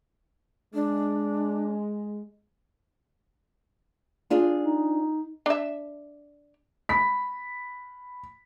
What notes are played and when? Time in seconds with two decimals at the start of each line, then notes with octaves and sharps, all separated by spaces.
0.74 G#3 D4
4.30 D4 F4 G#4
4.64 D#4
5.46 D4 E5
6.89 B5 B6